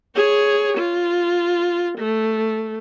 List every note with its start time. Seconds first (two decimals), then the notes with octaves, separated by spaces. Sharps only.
0.15 G#4 C#5
0.78 F4
1.98 A3